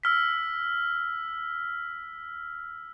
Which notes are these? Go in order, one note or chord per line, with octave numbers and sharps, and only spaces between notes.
E6 F6 B6